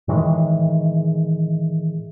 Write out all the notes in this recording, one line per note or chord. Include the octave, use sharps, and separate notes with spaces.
A2 D#3 E3 G#3